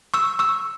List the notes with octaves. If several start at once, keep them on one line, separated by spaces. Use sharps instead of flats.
C#6 E6
C#6 E6